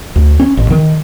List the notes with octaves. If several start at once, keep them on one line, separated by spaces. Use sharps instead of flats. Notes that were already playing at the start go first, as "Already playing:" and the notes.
D2
C#4
A1
D#3